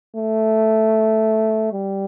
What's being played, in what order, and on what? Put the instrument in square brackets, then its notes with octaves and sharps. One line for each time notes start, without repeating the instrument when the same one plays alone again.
[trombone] A3
G3